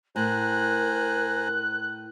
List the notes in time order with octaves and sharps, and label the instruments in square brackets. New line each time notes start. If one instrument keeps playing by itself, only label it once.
[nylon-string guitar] A2 [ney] A#4 [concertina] C5 G#5 A#5 [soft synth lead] F#6